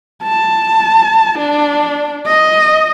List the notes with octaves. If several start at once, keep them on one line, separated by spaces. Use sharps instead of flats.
A5
D4
D#5